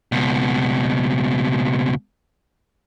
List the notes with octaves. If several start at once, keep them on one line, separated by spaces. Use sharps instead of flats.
C#2 B2